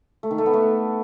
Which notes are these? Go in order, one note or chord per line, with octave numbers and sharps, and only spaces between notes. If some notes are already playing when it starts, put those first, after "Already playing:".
A3
D#3
A3
B3
A3